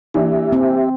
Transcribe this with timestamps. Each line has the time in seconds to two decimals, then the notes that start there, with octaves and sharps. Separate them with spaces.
0.14 E3 A#3 D4 G4 E5
0.53 C4